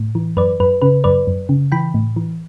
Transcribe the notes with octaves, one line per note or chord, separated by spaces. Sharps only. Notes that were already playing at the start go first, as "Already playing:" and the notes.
Already playing: A2
E3
F#2 B4 D5
F#2 B4
C#3 B4
F#2 B4 D5
F#2
C#3
E3 G5 B5
A2
E3